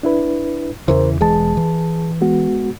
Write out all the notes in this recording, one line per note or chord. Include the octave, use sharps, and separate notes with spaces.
D4 E4 B4
E2 C#3 E3 A#4 C5
E1 E3 G#3 G#4 A5
E3
G#3 B3 F#4